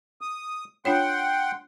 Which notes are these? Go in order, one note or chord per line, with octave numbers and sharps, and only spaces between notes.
D#6
D4 F4 C#5 F#5 G5 C6